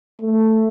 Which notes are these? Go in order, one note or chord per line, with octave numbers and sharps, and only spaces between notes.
A3